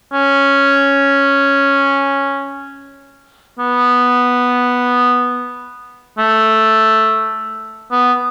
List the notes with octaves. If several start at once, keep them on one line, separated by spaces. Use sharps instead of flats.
C#4
B3
A3
B3